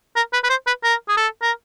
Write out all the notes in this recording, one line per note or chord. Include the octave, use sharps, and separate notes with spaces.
A#4
B4
B4
C5
B4
A#4
G#4
A4
A#4